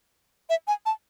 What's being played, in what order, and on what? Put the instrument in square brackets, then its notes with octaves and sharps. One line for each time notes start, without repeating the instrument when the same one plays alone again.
[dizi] E5
G#5
A5